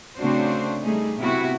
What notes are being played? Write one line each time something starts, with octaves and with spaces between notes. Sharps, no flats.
C#3 A3 C4 D4 F#4 C5
G3 A3 D#4 G#4
C3 B3 E4 F#4